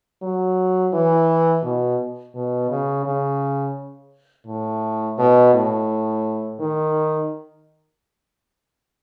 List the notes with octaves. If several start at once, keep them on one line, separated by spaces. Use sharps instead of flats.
F#3
E3
B2
B2
C#3
C#3
A2
B2
A2
D#3